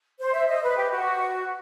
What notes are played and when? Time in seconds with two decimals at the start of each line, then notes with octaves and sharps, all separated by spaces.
0.20 C5
0.34 E5
0.48 D#5
0.63 B4
0.77 G4
0.91 F#4